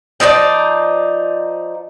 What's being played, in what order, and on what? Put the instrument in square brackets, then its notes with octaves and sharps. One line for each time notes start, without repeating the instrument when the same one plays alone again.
[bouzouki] F3 D#4 E4 D5